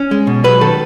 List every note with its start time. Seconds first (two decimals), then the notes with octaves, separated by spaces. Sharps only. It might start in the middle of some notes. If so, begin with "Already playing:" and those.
Already playing: C#4
0.11 G#3
0.27 B2
0.44 F#3 B4
0.61 D#3 A4